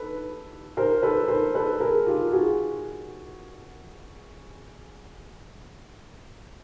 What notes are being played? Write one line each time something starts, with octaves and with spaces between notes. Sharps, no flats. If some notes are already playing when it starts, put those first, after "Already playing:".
Already playing: A4 B4
A#4 C5
A4 B4
A#4 C5
A4 B4
G#4 A#4
F4 G4
F#4 G#4